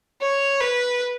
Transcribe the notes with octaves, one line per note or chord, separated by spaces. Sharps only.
C#5
B4